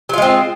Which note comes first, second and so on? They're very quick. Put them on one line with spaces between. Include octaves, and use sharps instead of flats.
F#3 F4 G#3 C4